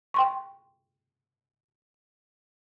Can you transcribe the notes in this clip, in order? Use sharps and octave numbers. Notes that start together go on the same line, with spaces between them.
G5 C6 C#6